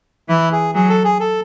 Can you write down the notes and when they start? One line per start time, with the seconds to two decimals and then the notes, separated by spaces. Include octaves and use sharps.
0.29 E3 E4
0.52 G#4
0.74 F#3 G#4
0.89 A4
1.04 G#4
1.20 A4